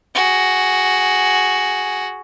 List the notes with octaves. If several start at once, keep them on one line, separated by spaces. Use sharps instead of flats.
F#4 G#4